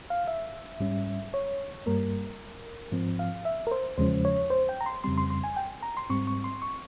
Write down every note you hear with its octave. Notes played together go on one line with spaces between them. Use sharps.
F5
E5
G#2 G3 C#4
C#5
G2 G3 A#3 A#4
G#2 F3 C4
F5
E5
A#4
C5
E2 C#3 F3 G#3 C#4 C5
C#5
C5
G5
A#5
C6
F2 C#3 G3 C4 C6
C6
C6
G#5
G5
A#5
C6
G#2 G3 C4 C#6
C#6
C6
C#6